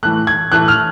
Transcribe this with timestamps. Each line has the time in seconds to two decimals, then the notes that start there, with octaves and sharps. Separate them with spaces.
0.03 A2 E3 A3 F#6
0.27 G#6
0.51 A2 E3 A3 F#6
0.68 F6